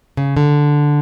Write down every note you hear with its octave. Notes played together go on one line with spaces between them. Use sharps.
C#3
D3